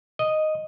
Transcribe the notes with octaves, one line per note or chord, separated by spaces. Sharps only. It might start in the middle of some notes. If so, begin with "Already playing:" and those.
D#5